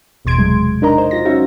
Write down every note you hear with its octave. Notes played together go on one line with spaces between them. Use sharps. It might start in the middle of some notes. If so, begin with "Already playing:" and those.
G1 E2 B2 C6 G#6 D7
C3 F#3 G#3
D4 D#4 A#4 D#5 A#5
C5
F#3 F4 A#6
F#3 C#4 D#4 F#4 E5